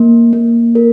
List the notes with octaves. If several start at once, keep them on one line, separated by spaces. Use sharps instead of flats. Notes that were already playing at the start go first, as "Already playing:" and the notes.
Already playing: A#3
A#3
A#4